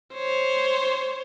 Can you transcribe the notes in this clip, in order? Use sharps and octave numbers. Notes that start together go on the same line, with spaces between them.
C5 C#5